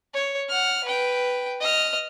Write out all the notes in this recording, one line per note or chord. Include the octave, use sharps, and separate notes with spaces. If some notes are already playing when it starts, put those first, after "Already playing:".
C#5
F#5 F6
B4 G5
D#5 F6